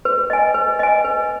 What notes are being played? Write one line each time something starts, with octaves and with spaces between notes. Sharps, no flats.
B4
D#5 G#5
B4
D#5 G#5
B4